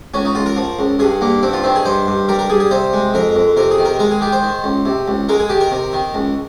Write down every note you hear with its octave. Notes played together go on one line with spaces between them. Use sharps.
C#2 C#4
D#4
C#2 F4
A#4
F3
C#2
G2 G#4
G2 A#3
G2 C4
F4
D#3 C4
G#4
G2 C5
G2
G3 A#4
A#4
G3 G#4
G#4
C3 C5
G#3
F2 A#4
F2
C3 A#4
G#4
D#3
A#4
G#3 A#4
G#4
D#3 G4
C5
D#3
C#2
C3
C#2
G#3 A#4
G#4
D#3 G4
A#4
C3
D#3
C#2